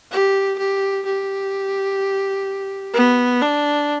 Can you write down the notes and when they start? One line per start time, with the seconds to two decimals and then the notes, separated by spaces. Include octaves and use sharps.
0.12 G4
0.58 G4
1.05 G4
2.94 B3
3.42 D4